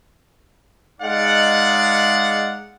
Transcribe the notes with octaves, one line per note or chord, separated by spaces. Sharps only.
G#3 D#4 D5 F5 F#5